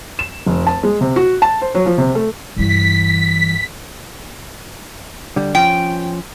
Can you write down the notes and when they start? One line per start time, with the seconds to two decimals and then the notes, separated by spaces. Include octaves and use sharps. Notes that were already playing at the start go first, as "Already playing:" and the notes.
0.19 E7
0.46 F1
0.67 A5
0.83 G#3
1.01 C3
1.16 F#4
1.42 A5
1.62 C5
1.75 F#3
1.86 F3
1.98 C3
2.15 A3
2.57 G2 E3 B6
5.36 D3 G3
5.55 F3 C#4 G5